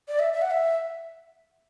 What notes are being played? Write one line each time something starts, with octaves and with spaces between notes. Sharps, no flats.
D5
E5
E5
F#5
E5